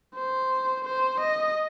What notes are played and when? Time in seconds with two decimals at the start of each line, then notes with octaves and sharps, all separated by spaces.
0.14 C5
0.85 C5
1.20 D#5